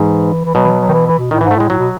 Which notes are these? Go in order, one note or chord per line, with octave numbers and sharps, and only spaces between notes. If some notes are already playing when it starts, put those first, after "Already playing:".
Already playing: G#2 E3
E3
B2 F#3
E3
F#3
F#3
D#3
E3
E3
B2
A2 D#3
E3
G#2
A3
A2 G#3
A2 F#3
B2